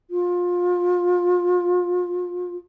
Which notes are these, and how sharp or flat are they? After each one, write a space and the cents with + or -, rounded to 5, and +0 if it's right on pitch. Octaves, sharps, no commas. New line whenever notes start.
F4 +30